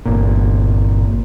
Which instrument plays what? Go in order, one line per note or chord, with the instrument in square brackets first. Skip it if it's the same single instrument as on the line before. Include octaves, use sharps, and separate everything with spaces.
[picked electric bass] G1 A#2